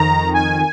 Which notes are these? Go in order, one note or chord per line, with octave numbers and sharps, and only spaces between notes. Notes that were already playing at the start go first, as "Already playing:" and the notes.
Already playing: F2 D#3 A#5
G#5